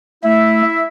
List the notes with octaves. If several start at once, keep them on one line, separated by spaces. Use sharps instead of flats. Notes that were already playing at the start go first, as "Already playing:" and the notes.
A3 E4 E5